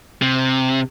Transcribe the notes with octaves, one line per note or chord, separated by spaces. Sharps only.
C3